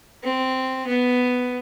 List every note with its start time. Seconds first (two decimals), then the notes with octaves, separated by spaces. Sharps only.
0.23 C4
0.87 B3